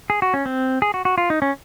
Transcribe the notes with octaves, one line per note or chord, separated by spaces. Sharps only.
G#4
F#4
C#4
C4
G#4
F#4
F#4
F4
D#4
C#4